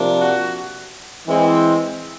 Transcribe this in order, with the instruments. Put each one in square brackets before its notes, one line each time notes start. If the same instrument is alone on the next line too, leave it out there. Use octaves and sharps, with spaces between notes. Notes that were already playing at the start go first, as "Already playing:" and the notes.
Already playing: [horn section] C3 F3 A#3 D4
F#4
E3 G#3 C4